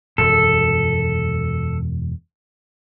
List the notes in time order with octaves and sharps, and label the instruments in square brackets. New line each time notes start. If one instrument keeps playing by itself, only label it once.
[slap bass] E1 F#2 [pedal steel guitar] A4